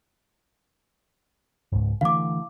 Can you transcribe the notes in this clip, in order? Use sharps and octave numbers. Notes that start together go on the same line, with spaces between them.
C#2 G#2
D3 E3 A3 F5 D6